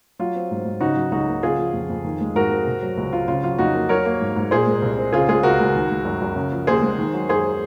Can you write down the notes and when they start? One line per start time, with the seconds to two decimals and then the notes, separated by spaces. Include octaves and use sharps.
0.19 F#3 F4
0.35 C4
0.51 G#2
0.65 G#2
0.81 C#3 D#4 F#4
0.96 F#3
1.11 C#2 D#4 F#4
1.27 A#3
1.43 C#3 F4 G#4
1.59 F3
1.73 F2
1.89 F2
2.04 D#3
2.21 G#3
2.35 G#2 F#4 A#4
2.51 C4
2.67 C3
2.82 F#3
2.97 C#2
3.12 C4 F4
3.28 C#3 F4
3.43 F#3 F4
3.58 F2 D#4 F#4
3.74 A#3
3.89 F#3 A#4 C#5
4.05 A#3
4.21 G#2
4.36 G#2
4.51 A#2 G#4 C5
4.67 G#3
4.82 C2
4.97 C4
5.13 C#3 F4 G#4
5.28 G#3 F4 G#4
5.43 C#2 F#4 A#4
5.60 C#2
5.75 D#3
5.90 G#3
6.05 F#2
6.22 F#2
6.36 C#3
6.52 F3
6.67 D#2 G#4 C5
6.82 G#3
6.98 D#3
7.14 F#3
7.29 F#2 G#4 C5